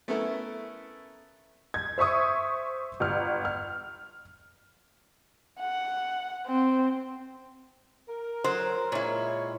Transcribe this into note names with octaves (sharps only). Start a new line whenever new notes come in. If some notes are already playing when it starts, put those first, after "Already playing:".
A3 B3 C#4 E4 A4 A#4
G#6
C5 E5 C#6 D#6
G1 F6
F6
F#5
C4
A#4
F#3 C5
A#2 G#3 E4 F4 C#5